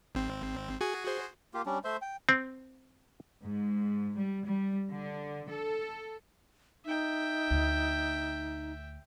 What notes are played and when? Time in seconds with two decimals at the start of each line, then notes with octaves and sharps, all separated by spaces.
0.15 G#1 C4
0.81 F#4 G#4 G#5
1.04 F#4 G#4 C5
1.54 A#3 F4 G4
1.66 G3 C#4 D4
1.84 A3 C5 E5 C6
2.02 G5
2.29 C4
3.45 G#2
4.16 G3
4.46 G3
4.92 D3
5.49 A4
6.86 D#4 E5 G5
7.51 D2